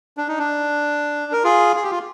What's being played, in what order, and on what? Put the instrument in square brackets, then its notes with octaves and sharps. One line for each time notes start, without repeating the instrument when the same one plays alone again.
[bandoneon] D4
D#4
D4
A#4
F4 G#4
G#4
G4
F4